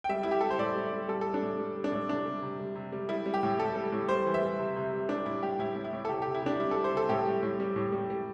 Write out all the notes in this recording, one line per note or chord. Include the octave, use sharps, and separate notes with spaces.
G5
G3 E5
G3 E4
G4
G3 A4
C5
A2 D5
G3
G3
G3 A4
A4
G3
D4
A2
G3
G3
D4
A2
C3 D4
G3
C3
G3
C3
G3
G3 E4
G3
G4
A2
G3 A4
G3
A2
G3 C5
E3
E5
G3
C3
C3
G3
G3 D4
A2 E4
G3 G4
A2 E4
A2
E4
A2
A4
C3 G4
G4
C3
E4
C3 D4
G3 E4
A4
G3
C5
C3 A4
A2 G4
G3
A2
G3
A2
G3
G3